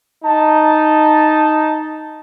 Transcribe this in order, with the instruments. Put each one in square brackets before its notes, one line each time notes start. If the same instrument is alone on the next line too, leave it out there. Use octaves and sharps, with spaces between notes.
[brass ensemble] D#4 A5